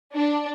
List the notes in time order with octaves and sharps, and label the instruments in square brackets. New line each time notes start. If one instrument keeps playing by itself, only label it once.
[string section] D4